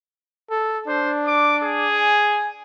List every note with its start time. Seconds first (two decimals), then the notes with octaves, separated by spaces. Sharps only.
0.51 A4
0.88 D4 C5
1.27 D6
1.63 G#4
1.97 G#5